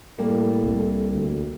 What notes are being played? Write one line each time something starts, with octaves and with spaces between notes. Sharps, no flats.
A2 G3 A#3 A4
C2
D2